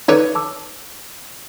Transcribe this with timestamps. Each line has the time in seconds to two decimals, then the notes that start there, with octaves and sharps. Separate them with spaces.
0.08 D#4 A4 B4 C#5 D5 G#6
0.35 A5 D6 E6